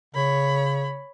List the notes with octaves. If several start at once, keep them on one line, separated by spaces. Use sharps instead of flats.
C#3 C#5 B5